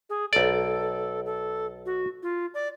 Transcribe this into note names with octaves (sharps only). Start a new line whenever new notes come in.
G#4
B1 A4 D5
A4
F#4
F4
D5